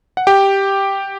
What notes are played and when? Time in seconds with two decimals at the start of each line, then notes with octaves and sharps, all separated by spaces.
0.17 F#5
0.27 G4 G5